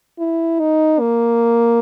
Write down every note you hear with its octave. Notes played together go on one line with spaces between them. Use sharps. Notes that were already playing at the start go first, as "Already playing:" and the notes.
E4
D#4
A#3